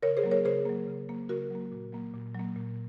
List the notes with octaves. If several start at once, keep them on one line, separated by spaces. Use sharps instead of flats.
C#3 A#4 C#5
G#4 C5
F#3 A#3
A#4 C#5
C#3 G#4 C5
F#3 A#3
C#3
F#3 A#3
C#3 F#4 A#4
F#3 A#3
A#2
F#3 A#3
A#2
F#3 A#3
A#2